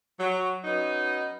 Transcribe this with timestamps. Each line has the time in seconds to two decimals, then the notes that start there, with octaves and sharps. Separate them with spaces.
0.20 F#3
0.64 F#3 B3 C#4 D#4